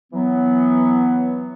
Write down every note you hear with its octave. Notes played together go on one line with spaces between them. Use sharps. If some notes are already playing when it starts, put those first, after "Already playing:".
E3 F#3 B3